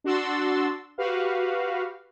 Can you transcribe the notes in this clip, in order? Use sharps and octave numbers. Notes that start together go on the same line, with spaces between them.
D4 F#4 C6 E6 A6
F#4 G4 B4 F5